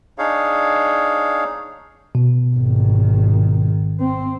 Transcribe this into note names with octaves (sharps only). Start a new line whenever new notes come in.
D4 D#4 G#4 C#5 F5
B2
G#1 D#3
C4